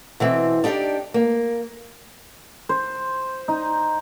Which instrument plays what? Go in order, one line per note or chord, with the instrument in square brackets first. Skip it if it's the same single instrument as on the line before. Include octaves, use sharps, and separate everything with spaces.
[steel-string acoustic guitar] B2 E3 C4
D4 D#4 G4 C5 D5
A#3
[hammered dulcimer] C5
D#4